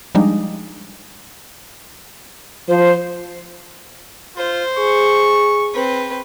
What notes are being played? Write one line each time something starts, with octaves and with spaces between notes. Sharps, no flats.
F3 G3 G#3 D4 D#4
F3 C5
F4 C5
G#4 C#6
C4 B4